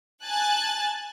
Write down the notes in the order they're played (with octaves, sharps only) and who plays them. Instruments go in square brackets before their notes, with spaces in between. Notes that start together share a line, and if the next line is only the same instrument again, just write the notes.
[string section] G#5 A5 F#6 A6